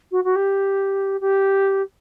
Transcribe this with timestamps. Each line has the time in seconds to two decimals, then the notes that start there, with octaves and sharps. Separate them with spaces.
0.11 F#4
0.24 F#4
0.35 G4
1.20 G4